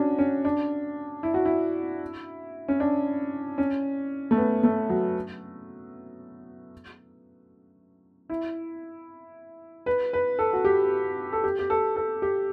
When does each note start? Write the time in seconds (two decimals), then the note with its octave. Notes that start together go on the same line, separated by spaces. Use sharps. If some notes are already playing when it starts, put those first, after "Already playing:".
Already playing: C#4 D4 F#4
0.19 C#4
0.45 D4
1.23 E4
1.34 F#4
1.45 E4
2.68 C#4
2.80 D4
3.58 C#4
4.31 A3
4.37 B3
4.63 A3
4.89 F#3
8.30 E4
9.86 B4
10.13 B4
10.39 A4
10.53 F#4
10.65 G4
11.33 A4
11.44 G4
11.59 G4
11.70 A4
11.96 A4
12.22 G4